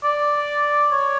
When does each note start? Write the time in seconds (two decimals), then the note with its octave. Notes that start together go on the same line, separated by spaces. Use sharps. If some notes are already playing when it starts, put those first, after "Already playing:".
0.04 D5
0.92 C#5